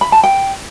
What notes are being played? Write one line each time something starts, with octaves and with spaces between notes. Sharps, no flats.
B5
A5
G5